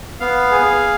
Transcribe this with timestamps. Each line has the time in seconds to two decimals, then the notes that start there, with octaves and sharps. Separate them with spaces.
0.20 B3 F5
0.52 G#4